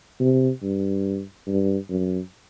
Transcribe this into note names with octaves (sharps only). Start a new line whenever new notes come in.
C3
G2
G2
F#2